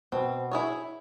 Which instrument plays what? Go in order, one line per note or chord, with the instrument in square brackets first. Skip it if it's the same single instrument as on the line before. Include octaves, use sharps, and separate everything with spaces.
[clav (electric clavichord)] B2 [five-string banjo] C4
[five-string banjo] E4 G#4 C#5